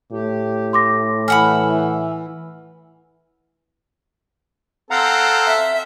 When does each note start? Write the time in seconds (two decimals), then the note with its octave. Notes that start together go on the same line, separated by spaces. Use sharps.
0.12 A2 G4
0.73 C6 D6 A#6
1.28 E3 E5 F#5 G#5 B5 F6
4.91 C4 A4 F5 F#5 A#5
5.46 E5